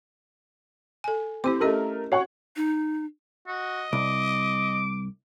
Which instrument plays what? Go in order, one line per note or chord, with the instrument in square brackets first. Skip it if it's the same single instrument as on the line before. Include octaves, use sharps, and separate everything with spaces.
[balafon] A4 G#5
[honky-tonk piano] C4 [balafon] E4 G4 D6
[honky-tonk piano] A3 A#4 [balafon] C#4 G4 D#5
[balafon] F#4 [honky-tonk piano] C#5 F#5 C#6
[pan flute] D#4
[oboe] F#4 [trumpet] D#5
[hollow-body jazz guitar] C2 [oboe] D6